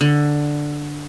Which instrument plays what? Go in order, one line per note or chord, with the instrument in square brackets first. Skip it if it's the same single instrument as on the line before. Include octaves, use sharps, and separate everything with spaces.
[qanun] D3